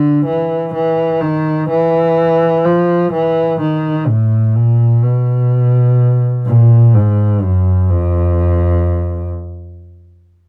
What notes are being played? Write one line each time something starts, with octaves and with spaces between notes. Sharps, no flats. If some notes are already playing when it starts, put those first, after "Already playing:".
Already playing: D3
E3
E3
D#3
E3
F3
E3
D#3
A2
A#2
B2
A#2
G#2
F#2
F2